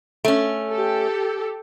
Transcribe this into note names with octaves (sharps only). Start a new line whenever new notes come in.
A3 C#4
G4 A4